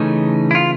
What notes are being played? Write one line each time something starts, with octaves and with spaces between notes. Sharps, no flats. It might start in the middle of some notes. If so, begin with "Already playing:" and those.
Already playing: C#3 E3 A3 C#4 D#4
E4
F4